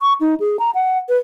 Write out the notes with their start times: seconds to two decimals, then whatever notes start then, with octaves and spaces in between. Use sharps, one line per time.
0.01 C#6
0.21 D#4
0.40 G#4
0.59 A#5
0.75 F#5
1.09 B4